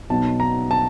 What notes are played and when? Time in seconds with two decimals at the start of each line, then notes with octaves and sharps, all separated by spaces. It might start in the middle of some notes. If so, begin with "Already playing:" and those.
0.10 B1 B2 F#3 B3 D#4 A5
0.40 A#5
0.71 A5